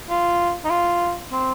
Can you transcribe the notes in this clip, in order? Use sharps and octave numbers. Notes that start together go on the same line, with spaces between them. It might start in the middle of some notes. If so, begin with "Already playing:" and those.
F4
D#4
F4
C4